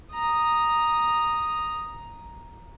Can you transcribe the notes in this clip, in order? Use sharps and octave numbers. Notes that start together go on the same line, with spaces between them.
A#5 D#6